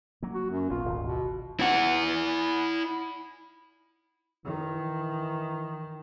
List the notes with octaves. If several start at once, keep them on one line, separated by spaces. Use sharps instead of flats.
F#3 A#3
F#4
F#2
A#1 B3 F4
D1 G#1
B2
E4 F#5
D#3 E3